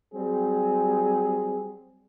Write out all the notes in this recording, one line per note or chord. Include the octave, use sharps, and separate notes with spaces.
F#3 G3 C4 G#4